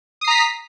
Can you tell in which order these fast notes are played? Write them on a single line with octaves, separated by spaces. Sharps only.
D#6 C7 A#5 B6